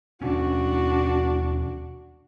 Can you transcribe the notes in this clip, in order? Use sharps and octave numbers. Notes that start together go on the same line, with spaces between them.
D#2 B2 C#4 D4 F#4